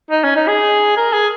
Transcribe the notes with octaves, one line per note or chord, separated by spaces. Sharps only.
D#4
C#4
D#4
G#4
A#4
G#4